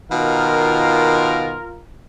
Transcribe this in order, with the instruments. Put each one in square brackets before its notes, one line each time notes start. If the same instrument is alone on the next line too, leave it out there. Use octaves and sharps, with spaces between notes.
[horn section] B2 D#3 F5 [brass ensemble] F4 A#4